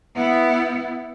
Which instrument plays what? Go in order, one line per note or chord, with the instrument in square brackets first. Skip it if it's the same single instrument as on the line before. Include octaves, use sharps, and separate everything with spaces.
[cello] B3 E4